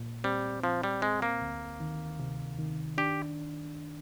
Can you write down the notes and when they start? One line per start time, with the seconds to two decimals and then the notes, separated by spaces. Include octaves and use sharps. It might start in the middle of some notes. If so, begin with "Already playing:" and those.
Already playing: A#2
0.24 G3 C4
0.63 F3 C4
0.83 G3
1.02 G#3 C4
1.22 A#3
1.42 D2
1.80 D#3
2.19 C3
2.59 D#3
2.98 D4 G4